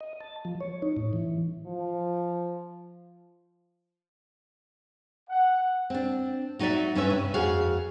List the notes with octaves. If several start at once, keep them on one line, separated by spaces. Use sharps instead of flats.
D#5
A5
F3
C#5
D#4
A2
E3
F3
F#5
C4 D4
F#3 D#4 F#4 C#5 D5 E5
G2 C#4 D4 B4 E5
C3
F2 F#4 G#4 F5